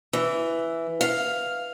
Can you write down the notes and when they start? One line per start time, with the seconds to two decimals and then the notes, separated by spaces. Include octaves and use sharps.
0.13 E3
1.01 F5